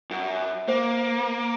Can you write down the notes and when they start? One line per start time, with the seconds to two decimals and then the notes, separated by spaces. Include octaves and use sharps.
0.11 F#2
0.68 A#3 C5